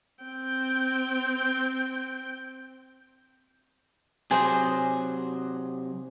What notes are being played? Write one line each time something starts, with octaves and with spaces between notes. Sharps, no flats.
C4 G5
C3 F#3 G#4 C5 D#5